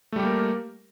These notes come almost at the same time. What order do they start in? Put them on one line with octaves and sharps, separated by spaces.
A3 G3 G4 A#3 A#4